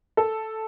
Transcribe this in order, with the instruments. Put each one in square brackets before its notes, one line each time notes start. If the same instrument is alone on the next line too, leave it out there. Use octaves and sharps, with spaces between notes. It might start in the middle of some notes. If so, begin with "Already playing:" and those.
[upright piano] A4